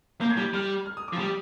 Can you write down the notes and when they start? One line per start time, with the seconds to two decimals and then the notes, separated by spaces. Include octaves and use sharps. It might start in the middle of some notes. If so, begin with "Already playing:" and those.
0.21 A#3 G6
0.30 G#6
0.37 G3 G6
0.54 G3 F6
0.86 F6
0.97 D#6
1.08 D6
1.13 F3
1.18 G3 D#6